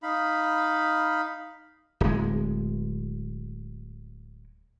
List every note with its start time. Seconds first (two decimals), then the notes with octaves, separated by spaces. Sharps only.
0.03 D#4 F5 B5
2.01 D1 G#3